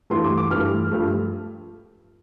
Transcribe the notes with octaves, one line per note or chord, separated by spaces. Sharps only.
G2 E3 A3 C6
D6
D6
G2 E3 A3 F6
G2 F3 A3